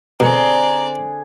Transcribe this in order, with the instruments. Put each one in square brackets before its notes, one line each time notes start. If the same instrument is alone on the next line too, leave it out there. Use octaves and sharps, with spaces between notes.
[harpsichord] B2 [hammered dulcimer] D3 G#4 [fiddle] C4 D5 [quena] A#5